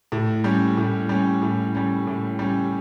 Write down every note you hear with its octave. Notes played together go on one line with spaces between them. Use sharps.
A2
G3 C#4
A2
G3 C#4
A2
G3 C#4
A2
G3 C#4